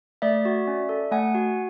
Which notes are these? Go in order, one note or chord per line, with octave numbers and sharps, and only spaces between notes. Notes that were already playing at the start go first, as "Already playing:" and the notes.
A3 D5 E5
F#4
C#4
A4
A3 F#5 G#5
F#4